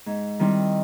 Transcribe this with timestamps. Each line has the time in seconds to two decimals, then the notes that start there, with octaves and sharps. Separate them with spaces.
0.06 G#2
0.39 D#3 G3 C4 E4